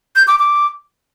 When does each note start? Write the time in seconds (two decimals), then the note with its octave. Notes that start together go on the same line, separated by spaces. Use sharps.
0.16 G6
0.28 D6
0.39 D6